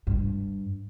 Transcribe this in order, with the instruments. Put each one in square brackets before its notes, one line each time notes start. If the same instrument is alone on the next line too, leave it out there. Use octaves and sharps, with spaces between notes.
[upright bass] G2